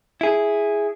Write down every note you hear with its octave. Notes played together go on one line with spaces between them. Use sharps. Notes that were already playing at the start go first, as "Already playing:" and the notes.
E4 G#4